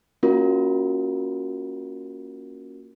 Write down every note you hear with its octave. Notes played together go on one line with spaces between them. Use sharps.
A#3 C#4 F4 F#4 A#4